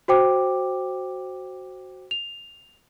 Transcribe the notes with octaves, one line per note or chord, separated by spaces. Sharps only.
F#4 C5 G5 D6
F7